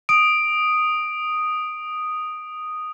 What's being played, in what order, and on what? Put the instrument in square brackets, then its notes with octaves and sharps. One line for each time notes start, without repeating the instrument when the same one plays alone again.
[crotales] D#6 [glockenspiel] D7